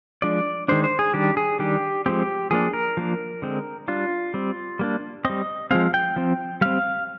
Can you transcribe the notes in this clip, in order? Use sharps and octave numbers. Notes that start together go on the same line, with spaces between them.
F3 G#3 D4 D5
D#3 G#3 D4 C5
C5
G#4
D#3 G3 D4 G4
G#4
D#3 G3 D4 G4
F3 G#3 C4 G4
F3 A#3 D4 G#4
A#4
F3 A#3 D4
D3 G#3 C4
G3 D4 F4
G3 C4
G3 A#3 D4
G3 C4 D#5
F3 G#3 C4 F5
G5
F3 C4
G3 C4 F5